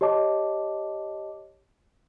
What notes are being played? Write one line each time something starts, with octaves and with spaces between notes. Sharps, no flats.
G4 C#5 D#5 A5 D6